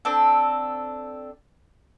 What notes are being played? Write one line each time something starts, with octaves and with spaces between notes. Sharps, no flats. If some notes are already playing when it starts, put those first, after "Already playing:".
C4 D4 A4